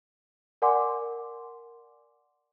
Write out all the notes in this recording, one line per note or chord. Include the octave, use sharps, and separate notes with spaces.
A#4 D5 F#5 G#5 C6 D6